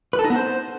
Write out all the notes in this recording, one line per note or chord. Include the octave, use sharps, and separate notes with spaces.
B4
A4
D#4
B3
C5